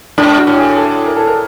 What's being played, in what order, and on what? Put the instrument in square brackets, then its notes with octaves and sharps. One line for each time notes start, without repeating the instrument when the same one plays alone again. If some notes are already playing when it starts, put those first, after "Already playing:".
[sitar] G#2 [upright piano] D4
[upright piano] F#4
[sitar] A2
[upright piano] G#4
A4
A#4
A4
A#4